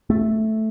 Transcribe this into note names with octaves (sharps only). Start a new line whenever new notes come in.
A3